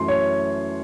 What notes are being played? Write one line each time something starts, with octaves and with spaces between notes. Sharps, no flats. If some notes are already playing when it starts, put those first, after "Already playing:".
Already playing: F#2 E3 A3 C6
C#5